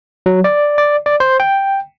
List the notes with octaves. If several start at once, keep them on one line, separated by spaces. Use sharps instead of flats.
F#3
D5
D5
D5
C5
G5